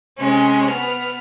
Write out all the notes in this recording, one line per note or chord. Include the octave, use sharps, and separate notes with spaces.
C3 G#3 C#4
B3 F6